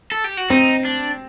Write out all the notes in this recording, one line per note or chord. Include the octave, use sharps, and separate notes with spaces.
A4
G4
F#4
C4 D#4
D4